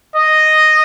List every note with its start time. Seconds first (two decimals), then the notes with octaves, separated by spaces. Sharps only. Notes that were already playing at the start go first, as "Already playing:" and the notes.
0.16 D#5